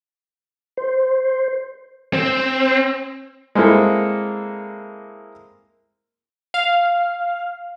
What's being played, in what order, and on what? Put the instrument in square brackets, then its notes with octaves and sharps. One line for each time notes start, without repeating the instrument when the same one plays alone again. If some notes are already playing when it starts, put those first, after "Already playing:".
[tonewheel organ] C5
[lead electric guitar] C4
[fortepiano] G#3 A#3 C4 E4 A4
[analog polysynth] F5